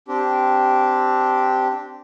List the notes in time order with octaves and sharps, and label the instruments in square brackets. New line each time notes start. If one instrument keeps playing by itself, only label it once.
[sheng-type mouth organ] C4 D4 G4